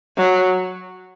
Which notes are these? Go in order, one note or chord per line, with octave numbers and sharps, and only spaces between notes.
F#3